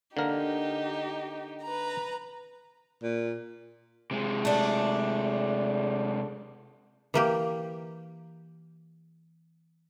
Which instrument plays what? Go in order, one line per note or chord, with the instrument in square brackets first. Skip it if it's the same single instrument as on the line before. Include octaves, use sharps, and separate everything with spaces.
[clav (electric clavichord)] D3 A#3 A#4 [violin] D#4 G4
[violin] B4 A#5
[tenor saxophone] A#2
[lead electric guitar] C3 G#3
[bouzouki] A3 D4
[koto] E3 A#3 G4